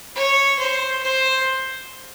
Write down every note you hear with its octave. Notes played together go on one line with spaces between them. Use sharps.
C#5
C5
C5